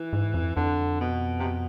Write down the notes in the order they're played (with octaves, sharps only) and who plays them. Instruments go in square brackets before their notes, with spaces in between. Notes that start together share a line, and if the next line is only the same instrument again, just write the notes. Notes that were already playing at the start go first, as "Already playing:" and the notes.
Already playing: [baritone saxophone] E3
[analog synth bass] G#2
F2
[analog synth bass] F2 [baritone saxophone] D3
[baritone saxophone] B2
C3
B2